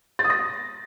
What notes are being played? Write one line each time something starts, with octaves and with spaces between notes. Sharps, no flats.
A6
D#6
A#6